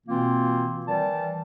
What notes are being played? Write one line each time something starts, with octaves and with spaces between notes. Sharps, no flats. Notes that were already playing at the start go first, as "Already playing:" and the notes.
B2 E3 A#3 C4 F4
D#3 E3 G3 D5 A5